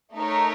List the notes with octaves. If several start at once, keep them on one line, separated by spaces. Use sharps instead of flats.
A3 D#4 A#4 C#5